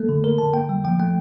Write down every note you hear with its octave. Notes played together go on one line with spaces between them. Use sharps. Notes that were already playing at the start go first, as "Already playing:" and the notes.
Already playing: A3 A#3 A4
D3
D3 A#4
D3 A5
A#3 G5
G3
F3 G5
A3 G5